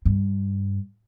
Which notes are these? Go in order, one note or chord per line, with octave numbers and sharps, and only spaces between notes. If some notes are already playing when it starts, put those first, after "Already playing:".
G2